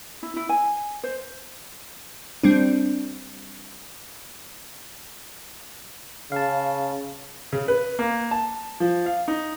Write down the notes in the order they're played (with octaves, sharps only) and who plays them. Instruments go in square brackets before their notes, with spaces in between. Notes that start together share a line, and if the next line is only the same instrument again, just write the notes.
[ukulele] E4
E4
G#5
C5
[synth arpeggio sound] G3 C4 D4
[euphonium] C#3 [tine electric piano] F5 A5
[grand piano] C#3
B4
A#3
A5
F3
F5
D#4